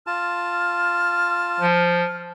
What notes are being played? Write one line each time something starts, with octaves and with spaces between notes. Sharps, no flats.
F4 A5 F6
F3